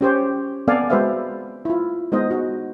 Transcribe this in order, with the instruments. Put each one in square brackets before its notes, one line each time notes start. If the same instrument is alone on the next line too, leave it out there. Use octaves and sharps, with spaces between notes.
[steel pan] C#4 G4 C5 C#5
B3 C4 A4 D5 F5 G#5
G#3 F#4 B4 C5 E5 F5
E4 F4
G#3 B3 D#4 C5 D#5
F#4